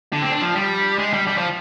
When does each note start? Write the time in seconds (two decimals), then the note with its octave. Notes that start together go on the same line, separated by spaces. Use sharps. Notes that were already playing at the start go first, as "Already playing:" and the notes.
0.13 D3
0.22 C4
0.31 D4
0.41 F3
0.56 G3
0.98 G#3
1.13 G3
1.27 G3
1.38 F3